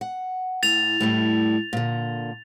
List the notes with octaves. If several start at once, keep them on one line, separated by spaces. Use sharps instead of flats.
F#5
A2 A6 F7
A2 G3 A3
A#2 D3